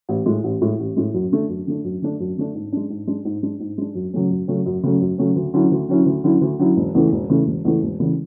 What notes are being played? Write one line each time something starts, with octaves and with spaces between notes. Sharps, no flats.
A1
A2 G#3
A1
A2 G#3
A1
A2 G#3
F#2
D3 A3 D4
F#2
D3 A3 D4
F#2
D3 A3 D4
F#2
D3 A3 D4
G#2
G#3 D4
G#2
G#3 D4
G#2
G#3 D4
G#2
G#3 D4
F#2
C#3 F#3 A3 C#4
F#2
C#3 F#3 A3 C#4
F#2
C#3 F#3 A3 C#4
F#2
C#3 F#3 A3 C#4
D2
D3 F#3 C#4 E4
D2
D3 F#3 C#4 E4
D2
D3 F#3 C#4 E4
D2
D3 F#3 C#4 E4
E1
E2 C#3 E3 A3
E1
E2 C#3 E3 A3
E1
E2 C#3 E3 A3
E1
E2 C#3 E3 A3